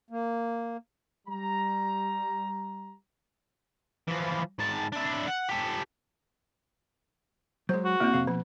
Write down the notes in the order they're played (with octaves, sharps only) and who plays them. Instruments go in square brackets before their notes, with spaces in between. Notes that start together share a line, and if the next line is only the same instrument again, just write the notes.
[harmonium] A#3
[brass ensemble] G3 A#5
[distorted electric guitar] E3 F3
G#2 A5
D4 E4
F#5
G4 A4
[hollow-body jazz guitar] F#3 G#3 [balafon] C5
[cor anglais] F#4
[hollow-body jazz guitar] C#2 E4 D5 [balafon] A#3 C4
[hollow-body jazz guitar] F2 C3 F5
[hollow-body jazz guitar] B2 [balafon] F3